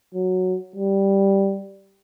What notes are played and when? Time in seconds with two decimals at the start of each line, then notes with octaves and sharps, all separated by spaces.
0.14 F#3
0.76 G3